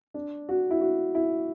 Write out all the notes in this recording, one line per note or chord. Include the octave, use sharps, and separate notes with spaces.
D4
F#4
E4
F#4
E4